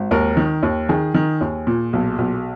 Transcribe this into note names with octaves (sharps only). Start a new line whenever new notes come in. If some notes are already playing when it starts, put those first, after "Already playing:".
Already playing: G#1
D#2 A#4
D#3
D#2
D#3 G#4
D#3
D#2
A#2
B1
B1